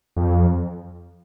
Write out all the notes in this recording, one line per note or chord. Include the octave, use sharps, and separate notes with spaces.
F2